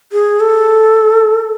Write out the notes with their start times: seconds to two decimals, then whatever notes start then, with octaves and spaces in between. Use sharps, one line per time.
0.12 G#4
0.40 A4